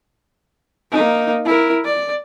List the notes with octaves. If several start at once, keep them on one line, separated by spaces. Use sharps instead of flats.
A#3 D#4
E4 A#4
D5